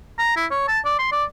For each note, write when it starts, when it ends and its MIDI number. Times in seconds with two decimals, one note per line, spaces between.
0.18 0.34 82
0.36 0.46 64
0.51 0.64 73
0.68 0.79 81
0.85 0.94 74
0.99 1.09 84
1.12 1.24 74